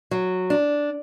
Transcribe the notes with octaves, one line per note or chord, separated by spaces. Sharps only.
F#3
D4